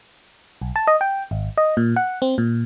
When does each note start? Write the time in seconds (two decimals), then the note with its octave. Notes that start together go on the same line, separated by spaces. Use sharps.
0.62 B1
0.76 A5
0.87 D#5
1.01 G5
1.31 G#1
1.58 D#5
1.77 A#2
1.96 F#5
2.22 C4
2.38 A#2